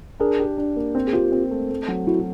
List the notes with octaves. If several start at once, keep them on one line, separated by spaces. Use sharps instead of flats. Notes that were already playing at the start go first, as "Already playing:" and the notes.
D4 G#4 A#4
G4
D4
A#3
C4
G#4
C4 F4 G4
C4
A3
A3
F#3
F#3 E4 F#4